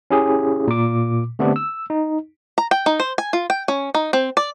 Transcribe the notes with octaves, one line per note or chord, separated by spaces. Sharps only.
C#4 E4 G4 G#4
A#2 D6
D3 A3 B3 C4 D4 G4
E6
D#4
A#5
G5
D#4
C5
G#5
F4
G5
C#4
D#4
C4
D5